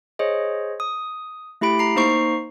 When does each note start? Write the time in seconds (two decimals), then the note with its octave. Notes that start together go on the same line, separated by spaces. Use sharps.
0.19 G#4 C5 C#5 D#5
0.80 D#6
1.61 A3 E4 G4 B5 D7
1.79 A#5 C7
1.96 A#3 D#4 C5 A#5 C#6 C7